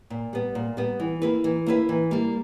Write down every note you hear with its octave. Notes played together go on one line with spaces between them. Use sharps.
A#2
G3 B3
A#2
G3 B3
E3
A#3 E4 B4
E3
A#3 E4 B4
E3
G3 A#3